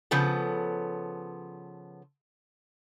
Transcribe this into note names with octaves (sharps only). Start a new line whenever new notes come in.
C#3 F3 B3 A4